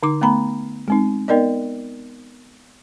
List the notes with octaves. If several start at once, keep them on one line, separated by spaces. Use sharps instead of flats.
D3 D#4 D6
A3 B3 A#5 B5
G#3 C4 D#4
B3 D#4 A#4 D5 D#5